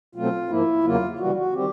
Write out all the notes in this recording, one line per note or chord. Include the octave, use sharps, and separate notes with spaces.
B2 F#3 A3 C4 F4
G#2 F3 A#3 E4
E2 C#3 F#3 A#3 F4
F4
C#3 E3 G3 F#4
F#4
D#3 G3 C4 G4